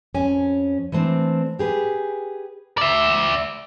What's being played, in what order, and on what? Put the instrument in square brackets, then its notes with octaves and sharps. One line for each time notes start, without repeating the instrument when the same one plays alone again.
[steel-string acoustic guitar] F2 C#4 G#5
E3 A3 C4 D4
G4 G#4 B4
[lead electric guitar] D5 E5